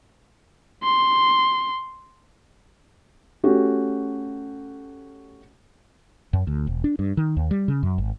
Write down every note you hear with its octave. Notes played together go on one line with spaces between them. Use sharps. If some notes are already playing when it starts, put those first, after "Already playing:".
C6
A3 C#4 F#4 G4
F#2
D2
E1
D4
G2
D#3
D#2
G3
C#3
F#2
G#1